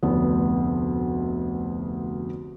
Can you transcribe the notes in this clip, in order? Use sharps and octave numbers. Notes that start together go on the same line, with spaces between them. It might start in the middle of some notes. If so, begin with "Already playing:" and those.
F1 D2 B3